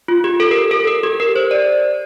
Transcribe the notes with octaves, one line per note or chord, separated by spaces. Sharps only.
F4
G4
A4
A#4
A4
A#4
G4
A#4
C5
D5